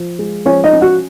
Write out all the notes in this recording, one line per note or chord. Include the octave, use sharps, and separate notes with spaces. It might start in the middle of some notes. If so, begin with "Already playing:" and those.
Already playing: F3
G#3
F3 C#4 C#5
D#4 D#5
C#4
F#4 F#5